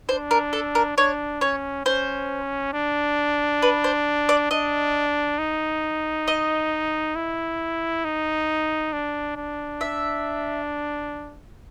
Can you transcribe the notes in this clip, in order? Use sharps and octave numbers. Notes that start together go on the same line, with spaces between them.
D4 C5
A#4
A4
A#4
D4 C#5
C#4 C#5
C#4 C5
D4
B4
C5
D5
D4 D#5
D#4
D#5
E4
D#4
D4
D4
E5